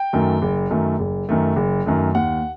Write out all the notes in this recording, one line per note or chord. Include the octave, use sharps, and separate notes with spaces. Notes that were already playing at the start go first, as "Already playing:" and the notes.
Already playing: G5
F#2 D#3 A3
F#1
F#2 D#3 A3
F#1
F#2 D#3 A3
F#1
F#2 D#3 A3
D#2 F#5